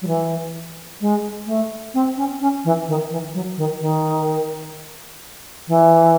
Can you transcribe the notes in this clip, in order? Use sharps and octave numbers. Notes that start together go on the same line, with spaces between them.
F#3
E3
G#3
A3
C4
C#4
C#4
E3
D#3
E3
F#3
D#3
D#3
E3